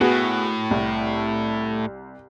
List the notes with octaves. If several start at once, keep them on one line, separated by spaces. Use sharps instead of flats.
A2 B3 F#4 G#4
C2